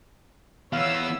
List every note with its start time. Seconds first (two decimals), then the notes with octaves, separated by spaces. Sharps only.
0.73 E3 B3 C#5 F5 E6